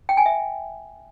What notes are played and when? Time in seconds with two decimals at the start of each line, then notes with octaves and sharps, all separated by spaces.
0.09 G5
0.17 G#5
0.26 E5